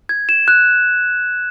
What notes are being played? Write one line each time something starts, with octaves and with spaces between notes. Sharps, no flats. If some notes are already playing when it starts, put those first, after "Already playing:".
G#6
E7
F#6